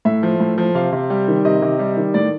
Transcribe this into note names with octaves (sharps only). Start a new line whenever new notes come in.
A2 E5
F3
A2
F3
C3 F5
C3
G3
D#3
C3 D#5
C3
G3
D#3
A2 D5